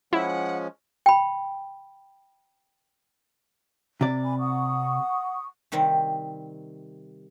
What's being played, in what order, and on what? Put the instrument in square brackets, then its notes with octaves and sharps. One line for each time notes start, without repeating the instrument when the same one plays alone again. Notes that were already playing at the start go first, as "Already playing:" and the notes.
[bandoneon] F3 G#3 C#4 [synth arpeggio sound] E4 [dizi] F#5
[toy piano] G5 B5
[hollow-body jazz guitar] C3 D5
[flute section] G#5 B5
F#5 C#6 D#6
[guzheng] C3 D#3 G3 C4